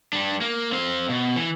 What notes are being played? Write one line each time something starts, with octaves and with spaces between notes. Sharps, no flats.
G3 D4
A#3
C4 F5
B2
E3